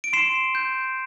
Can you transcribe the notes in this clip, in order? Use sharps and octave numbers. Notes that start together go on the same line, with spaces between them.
D7
C6 C7 E7
G6